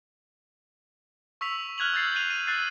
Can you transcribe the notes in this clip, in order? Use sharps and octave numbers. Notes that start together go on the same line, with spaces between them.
C#6 E6 B6 F7
F6 F#6 G#6 F7 F#7
E6 G6 A6 C7
F#6 D#7 F7
D#7
E6 F#6 A6 C7